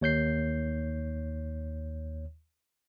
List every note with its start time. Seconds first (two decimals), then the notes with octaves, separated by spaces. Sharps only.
0.01 D#2 C#5 G6 C7